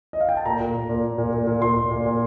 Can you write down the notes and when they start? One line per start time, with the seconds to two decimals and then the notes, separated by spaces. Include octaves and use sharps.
0.13 D#5
0.21 F5
0.29 G5
0.37 A5
0.45 A#2 A#5
0.60 A#2
0.75 A#2
0.89 A#2
1.04 A#2
1.18 A#2
1.33 A#2
1.47 A#2
1.62 A#2 C6
1.77 A#2
1.91 A#2
2.06 A#2